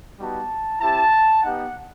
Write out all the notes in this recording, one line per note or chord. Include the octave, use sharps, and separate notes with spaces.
G3 B3 D#4 F#4 A5
C4 E4 G4 A5
B3 D#4 G4 F#5